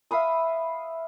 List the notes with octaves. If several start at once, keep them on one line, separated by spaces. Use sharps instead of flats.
E5 F5 B5 D#6